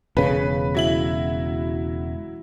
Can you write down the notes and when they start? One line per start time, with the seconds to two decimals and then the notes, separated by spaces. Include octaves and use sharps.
0.17 E1 C#3 B4
0.75 F#3 E4 F#7